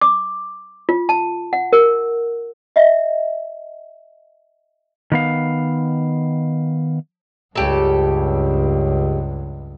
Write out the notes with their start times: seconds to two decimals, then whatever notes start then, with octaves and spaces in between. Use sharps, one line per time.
0.01 D6
0.89 F4
1.09 A5
1.53 F#5
1.73 A#4
2.76 D#5 E5
5.12 D#3 B3 F5
7.55 C#2 G2 C#3 G4 A4